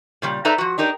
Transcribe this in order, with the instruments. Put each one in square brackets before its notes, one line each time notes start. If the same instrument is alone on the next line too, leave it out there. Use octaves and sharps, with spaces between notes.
[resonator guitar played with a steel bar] A#2 C#3 G3
D#4 A4 B4 D5 E5 A#5
F3 F#4
D4 D#4 G4 A#4